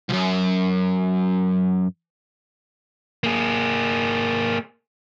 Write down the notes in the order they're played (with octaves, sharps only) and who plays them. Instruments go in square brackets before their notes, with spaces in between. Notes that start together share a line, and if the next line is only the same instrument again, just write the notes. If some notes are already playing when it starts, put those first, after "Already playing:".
[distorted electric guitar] C2 F#2
[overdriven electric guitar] A#3 G#4